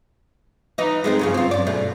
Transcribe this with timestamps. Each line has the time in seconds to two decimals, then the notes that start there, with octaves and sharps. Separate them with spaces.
0.78 E3 D#4
1.04 G#3 A3 C4
1.19 G2 C#3 F3
1.34 C4 F4
1.51 F#2 D5
1.67 B2 A3